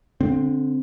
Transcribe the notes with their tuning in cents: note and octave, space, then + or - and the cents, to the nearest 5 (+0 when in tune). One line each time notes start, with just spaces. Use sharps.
D3 -20 C4 +0